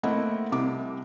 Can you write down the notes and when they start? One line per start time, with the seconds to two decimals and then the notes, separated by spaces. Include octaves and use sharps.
0.03 A3 A#3 C4 E4 D#5 F#5
0.52 C2 C3 D6